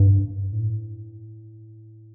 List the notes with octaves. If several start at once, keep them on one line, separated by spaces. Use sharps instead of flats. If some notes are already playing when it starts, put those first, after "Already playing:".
Already playing: G2
A2